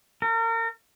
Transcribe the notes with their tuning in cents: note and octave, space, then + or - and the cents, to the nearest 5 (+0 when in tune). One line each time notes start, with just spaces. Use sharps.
A#4 -35